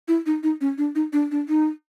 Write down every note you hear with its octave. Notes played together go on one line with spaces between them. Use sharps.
E4
D#4
D#4
C#4
D4
D#4
D4
D4
D#4